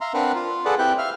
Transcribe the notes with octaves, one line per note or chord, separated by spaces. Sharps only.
E5 F5 A#5 C6
C4 D4 A#4 B4 F5 F#5
F4
G#4 A4 B4 D5 F#5
C4 E4 G4 B4 G5 F#6
E5 F5 F6